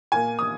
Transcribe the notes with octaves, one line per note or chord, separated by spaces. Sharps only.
A#2 A#3 G#5
D#6